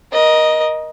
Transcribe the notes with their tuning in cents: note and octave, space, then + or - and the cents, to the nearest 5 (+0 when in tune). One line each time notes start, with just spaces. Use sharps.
A#4 +30 D#5 +0